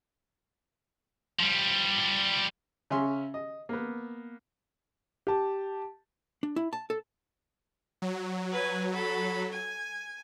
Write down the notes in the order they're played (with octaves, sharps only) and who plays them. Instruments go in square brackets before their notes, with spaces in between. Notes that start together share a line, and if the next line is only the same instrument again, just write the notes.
[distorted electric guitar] F3 G3
[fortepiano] C#3 C#4 E5 C6
D#5
A#3 B3
[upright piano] G4 A5
[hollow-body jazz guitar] D4
E4
A5
A4
[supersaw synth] F#3
[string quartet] B4 G#5
A4 B5
G#5